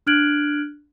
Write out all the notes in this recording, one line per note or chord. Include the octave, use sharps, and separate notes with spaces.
D4 F6 F#6 G#6 D7 F#7